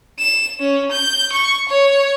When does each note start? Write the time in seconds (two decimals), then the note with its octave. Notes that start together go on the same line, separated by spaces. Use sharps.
0.19 E7
0.60 C#4
0.91 G6
1.33 C#6
1.69 C#5